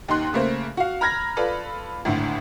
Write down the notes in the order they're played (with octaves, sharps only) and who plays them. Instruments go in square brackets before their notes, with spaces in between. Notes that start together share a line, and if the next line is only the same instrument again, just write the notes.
[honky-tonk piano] D#2 D#4 C6 F#6
C#3 A3 A#3 C5
F#4 F5
A#5 B5 F6 G#6 A#6
F4 A4 B4 D5 B5
G#1 D2 A2 D3